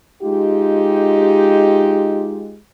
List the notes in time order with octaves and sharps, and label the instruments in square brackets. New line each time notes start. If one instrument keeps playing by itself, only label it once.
[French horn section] G#3 D#4 F4 G4